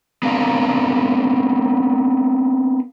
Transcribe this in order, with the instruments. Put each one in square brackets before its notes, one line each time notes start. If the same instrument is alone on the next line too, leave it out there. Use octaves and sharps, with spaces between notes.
[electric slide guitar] B3 C4 D4 A#4 F5